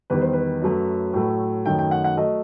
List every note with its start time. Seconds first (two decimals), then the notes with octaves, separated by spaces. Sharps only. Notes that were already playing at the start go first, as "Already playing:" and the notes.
0.10 E2 D#3 G3 B4
0.21 C5
0.33 B4
0.62 F#2 F#3 A3
1.14 A2 F#3 A3
1.65 F#2 D#3 F#3 A3 G5
1.79 G5
1.91 F#5
2.04 F#5
2.17 F#3 A3 D#5